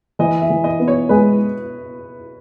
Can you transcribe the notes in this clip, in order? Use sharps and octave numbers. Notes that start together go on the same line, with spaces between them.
E3 D#5
E5
E3
D#5
B3
C#5
G#3 B4